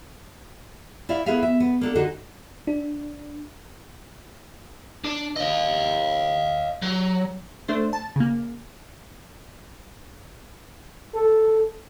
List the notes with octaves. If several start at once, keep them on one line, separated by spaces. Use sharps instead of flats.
E4 D5 E5 F5
B3 E4 G#4 E5 F5
E5
B3
A#3 D4 A4
D3 D4 D#4 F#4 G#4
D4
D4
D#5 F5
F#3
A3 D4 C5
A5
C#3 A#3
A4